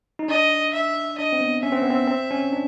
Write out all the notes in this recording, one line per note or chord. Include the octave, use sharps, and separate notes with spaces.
D#4
D4 D#5
E5
D4 D#5
C4
B3
C#4 E5
C4
B3
C4
C4
C#4
D4